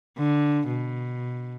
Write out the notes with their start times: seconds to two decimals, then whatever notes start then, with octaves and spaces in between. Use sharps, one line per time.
0.18 D3
0.68 B2